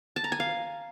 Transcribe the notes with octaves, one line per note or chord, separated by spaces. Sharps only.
A5
A#5
G#5
F5